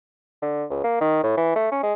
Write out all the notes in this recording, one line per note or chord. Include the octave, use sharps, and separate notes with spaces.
D3
C#2
A#3
D#3
A2
E3
A3
C#4
G#3